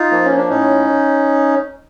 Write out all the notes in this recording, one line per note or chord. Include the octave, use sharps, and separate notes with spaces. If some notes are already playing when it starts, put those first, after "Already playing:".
Already playing: D#4 F4
F3 A#3
C#4
D4
A2 C#4 D#4